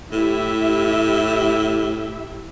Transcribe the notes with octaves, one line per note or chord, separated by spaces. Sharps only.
A2 E4 G4 E5